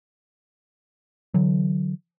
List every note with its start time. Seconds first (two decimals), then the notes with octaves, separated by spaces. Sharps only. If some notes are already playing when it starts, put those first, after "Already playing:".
1.34 D3 E3 F#3